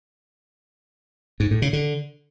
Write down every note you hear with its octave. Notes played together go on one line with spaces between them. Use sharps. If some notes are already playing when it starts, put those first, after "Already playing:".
G#2
A2
C#3
D3